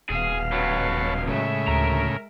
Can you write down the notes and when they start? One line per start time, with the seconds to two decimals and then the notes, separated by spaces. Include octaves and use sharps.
0.10 D#1 B2 G#4 F5
0.52 C#2 F#3 B4 C#5 A5
1.28 A2 C#3 G#3 E5
1.68 D2 A#4 A#5